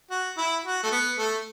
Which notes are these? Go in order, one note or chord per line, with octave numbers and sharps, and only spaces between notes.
F#4
E4
F#4
A3
B3
A3